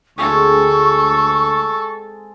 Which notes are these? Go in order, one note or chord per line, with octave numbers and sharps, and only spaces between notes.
D2 G#3 C4 G#4 A4 C#6